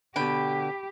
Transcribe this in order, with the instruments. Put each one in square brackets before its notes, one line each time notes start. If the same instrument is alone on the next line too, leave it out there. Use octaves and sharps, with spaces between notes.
[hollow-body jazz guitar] B2 D3 [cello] G4 [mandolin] G5 B5